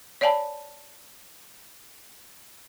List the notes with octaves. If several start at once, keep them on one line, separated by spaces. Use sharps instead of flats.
C#5 D5 F5 G#5 A5 B5